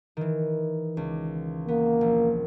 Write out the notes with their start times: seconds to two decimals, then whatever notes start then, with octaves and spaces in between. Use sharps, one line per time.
0.17 D#3 E3
0.97 C#2
1.68 A#3 B3
2.01 A#1